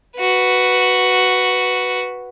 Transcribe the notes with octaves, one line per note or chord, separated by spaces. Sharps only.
F#4 B4